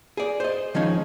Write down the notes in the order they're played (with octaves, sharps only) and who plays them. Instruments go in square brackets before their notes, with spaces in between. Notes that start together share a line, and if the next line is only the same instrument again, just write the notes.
[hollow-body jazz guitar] G#4 D5
C5 D#5
D#3 F3 G#3 C#4 D#4